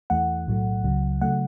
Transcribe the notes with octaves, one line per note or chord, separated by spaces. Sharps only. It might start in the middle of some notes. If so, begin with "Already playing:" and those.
E2 E3 A3 F#5
B1 A2 F#3 A3
C#2 C#3 F#3
C#3 F#3 A3 F#5